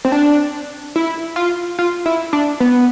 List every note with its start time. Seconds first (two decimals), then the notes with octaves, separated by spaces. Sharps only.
0.05 C4
0.12 D4
0.96 E4
1.36 F4
1.79 F4
2.06 E4
2.33 D4
2.60 B3